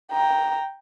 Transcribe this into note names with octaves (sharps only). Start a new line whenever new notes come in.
G5 A#5